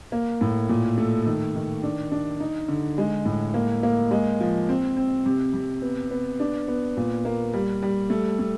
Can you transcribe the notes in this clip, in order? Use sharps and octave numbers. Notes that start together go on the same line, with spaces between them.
A#3
A2
A#2
A3
D#3
D#3
D4
D4
D#4
D3
G#3
A2
A#3
A#3
G#3
F3
C4
C4
C3
C3
B3
B3
D4
B3
A#2
A#3
G3
G3
A3
A3